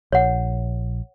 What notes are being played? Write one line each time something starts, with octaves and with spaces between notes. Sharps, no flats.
A#1 C#5 F#5